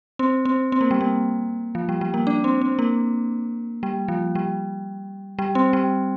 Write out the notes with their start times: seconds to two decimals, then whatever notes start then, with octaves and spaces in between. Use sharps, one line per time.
0.19 C4
0.45 C4
0.72 C4
0.81 A#3
0.91 G3
1.01 A#3
1.75 F3
1.89 G3
2.01 G3
2.14 A#3
2.27 D4
2.44 C4
2.61 C4
2.79 A#3
3.83 G3
4.08 F3
4.35 G3
5.39 G3
5.55 C4
5.73 G3